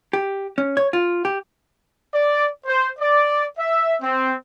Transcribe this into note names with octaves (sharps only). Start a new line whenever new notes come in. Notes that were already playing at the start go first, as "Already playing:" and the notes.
G4
C#4
C#5
F4
G4
D5
C5
D5
E5
C4